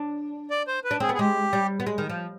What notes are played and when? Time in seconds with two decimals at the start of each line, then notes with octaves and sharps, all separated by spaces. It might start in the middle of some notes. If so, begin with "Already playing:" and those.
Already playing: D4
0.51 D5
0.68 C5
0.84 B4
0.91 D4
1.00 C4 G#4
1.09 B3
1.15 G#4
1.19 G#3 G4
1.53 G3
1.80 B3
1.87 G#3
1.98 D#3
2.09 F3